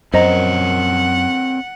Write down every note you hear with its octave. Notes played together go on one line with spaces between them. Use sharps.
F#2 C4 A#4 C5 C#5 D#5 F#5 A#5